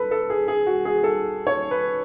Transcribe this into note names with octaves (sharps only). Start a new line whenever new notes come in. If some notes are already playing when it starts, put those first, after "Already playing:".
Already playing: A4 B4
A4
G#4
G#4
F#4
G#4
A4
C#5
B4